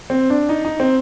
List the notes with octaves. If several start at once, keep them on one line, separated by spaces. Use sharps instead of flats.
C4
D4
D#4
D#4
C4